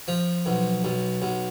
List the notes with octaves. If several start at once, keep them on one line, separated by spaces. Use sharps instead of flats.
F3
B1
B1
B1